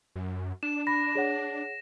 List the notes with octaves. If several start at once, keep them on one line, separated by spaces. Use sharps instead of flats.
F#2
D4 E7
B5 A#6
G#4 C#5 F#5